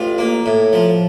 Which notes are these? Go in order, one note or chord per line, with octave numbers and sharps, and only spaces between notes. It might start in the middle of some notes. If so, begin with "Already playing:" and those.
Already playing: A1 F4
A#3
A2
F3